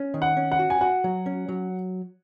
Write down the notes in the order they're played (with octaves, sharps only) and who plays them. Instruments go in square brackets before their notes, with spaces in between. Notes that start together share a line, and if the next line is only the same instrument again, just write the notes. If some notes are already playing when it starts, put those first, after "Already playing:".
Already playing: [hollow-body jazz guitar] C#4
D#3
[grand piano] F#5
[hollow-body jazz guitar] C#4
[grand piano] F#5
[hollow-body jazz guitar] F#4
[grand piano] G#5
[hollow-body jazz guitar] F#4 [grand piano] F#5
[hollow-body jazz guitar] F#3
C#4
F#3